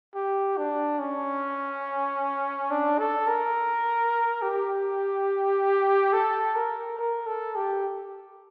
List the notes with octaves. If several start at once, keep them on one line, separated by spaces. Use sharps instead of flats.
G4
D4
C#4
D4
A4
A#4
G4
A4
A#4
A#4
A4
G4